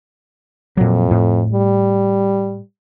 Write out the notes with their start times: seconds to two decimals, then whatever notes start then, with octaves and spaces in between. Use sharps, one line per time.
0.77 F2 A#2 F#3
1.11 A2
1.52 G3